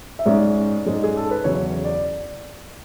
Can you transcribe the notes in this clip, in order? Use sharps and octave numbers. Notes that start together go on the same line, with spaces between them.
E5
G#2 G#3 C#4 D5
G#2 G#3 C#4
G#4
A4
B4
E2 C#3 F#3 C#5
D5